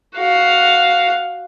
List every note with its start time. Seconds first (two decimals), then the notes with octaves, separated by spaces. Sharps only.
0.16 F#4 F5